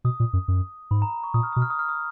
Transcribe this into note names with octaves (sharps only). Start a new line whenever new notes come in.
B2 D#6
A#2
F#2
F#2
G#2 B5
A#5
C#6
A#2 D#6
F6
B2 D#6
F6
D#6
F6
D#6